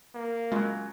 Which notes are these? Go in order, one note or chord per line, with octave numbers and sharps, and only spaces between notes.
A#3
C#3 F#3 G#3 F4